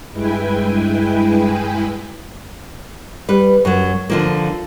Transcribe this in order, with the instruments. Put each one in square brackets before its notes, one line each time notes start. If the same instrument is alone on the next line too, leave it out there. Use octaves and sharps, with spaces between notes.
[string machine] G2 G#3 E4 B4 G5 G#5
[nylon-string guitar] G3 B4
F#2 F#3
D3 F3 A#3